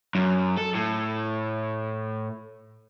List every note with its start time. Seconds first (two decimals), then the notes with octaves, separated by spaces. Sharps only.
0.15 F#2
0.57 A4
0.75 A2